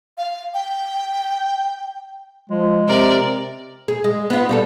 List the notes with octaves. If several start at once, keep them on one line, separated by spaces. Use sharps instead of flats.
F5
G5
F3 G#3
C3 A#4 D5
G#4
G#3
B3 F4
G3 F#4 A4